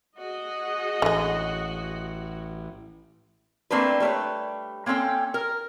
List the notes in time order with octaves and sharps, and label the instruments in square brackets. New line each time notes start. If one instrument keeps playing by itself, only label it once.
[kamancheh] F#4 [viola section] G#4 D#5
[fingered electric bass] A1 [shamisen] D3 G#3
[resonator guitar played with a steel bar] A3 A#3 C4 D4 B4
G3 A3 A#4 B4 C#5
A#3 C4 C#4 A4 G5
A#4